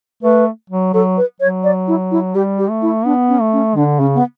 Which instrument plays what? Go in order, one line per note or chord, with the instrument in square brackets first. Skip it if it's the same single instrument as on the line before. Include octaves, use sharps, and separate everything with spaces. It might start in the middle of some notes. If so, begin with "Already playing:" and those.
[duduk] A3 [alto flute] B4
[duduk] F#3
[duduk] F#3 [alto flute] A4
[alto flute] B4
[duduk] F#3 [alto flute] C#5
[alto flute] D5
E4
E4
[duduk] G3 [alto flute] G4
[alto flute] G4
[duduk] A3
[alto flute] E4
[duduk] B3 [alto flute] D4
[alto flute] C#4
[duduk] A3
[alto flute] C#4
[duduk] D3 [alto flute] D4
[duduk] C#3 [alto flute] C#4
[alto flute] B3